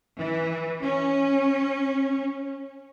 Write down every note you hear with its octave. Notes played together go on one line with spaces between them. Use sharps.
E3
C#4